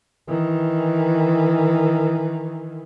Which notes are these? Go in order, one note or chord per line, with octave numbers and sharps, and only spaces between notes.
D#3 E3